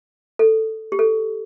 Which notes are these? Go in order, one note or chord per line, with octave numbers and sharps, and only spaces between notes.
A4
G4
A4